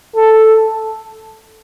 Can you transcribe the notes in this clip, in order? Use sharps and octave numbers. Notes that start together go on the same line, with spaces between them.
A4